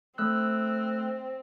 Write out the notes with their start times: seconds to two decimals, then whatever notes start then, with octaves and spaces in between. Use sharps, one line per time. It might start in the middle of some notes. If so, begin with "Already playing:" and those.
0.18 A3 C4 E6 F#6